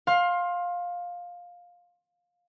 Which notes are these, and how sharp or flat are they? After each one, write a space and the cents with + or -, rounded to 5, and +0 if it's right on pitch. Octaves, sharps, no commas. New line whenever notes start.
F5 +15 C6 +25